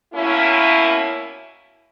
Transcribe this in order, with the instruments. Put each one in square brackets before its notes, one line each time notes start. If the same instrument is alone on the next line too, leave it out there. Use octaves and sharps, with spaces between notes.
[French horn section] B2 A#3 C#4 E4